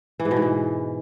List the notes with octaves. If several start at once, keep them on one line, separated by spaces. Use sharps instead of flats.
E3
G#2
B2
G#2
B2